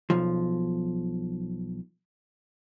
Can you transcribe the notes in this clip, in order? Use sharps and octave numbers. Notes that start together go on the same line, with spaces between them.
B1 F3